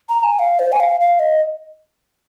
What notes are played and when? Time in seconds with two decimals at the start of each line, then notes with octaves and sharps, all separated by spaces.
0.09 A#5
0.24 G#5
0.39 F5
0.59 C5
0.72 G#5
0.80 F5
1.00 F5
1.19 D#5